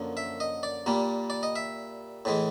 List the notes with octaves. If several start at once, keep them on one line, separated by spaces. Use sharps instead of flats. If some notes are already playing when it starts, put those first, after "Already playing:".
Already playing: F#2 D3 F3 A#3
E5
D#5
D5
A#2 G3 A#3
D5
D#5
E5
A2 E3 G#3